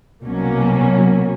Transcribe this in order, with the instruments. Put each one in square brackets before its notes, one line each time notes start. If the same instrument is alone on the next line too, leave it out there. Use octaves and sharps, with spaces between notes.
[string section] C2 B2 F#3 A#3 C#4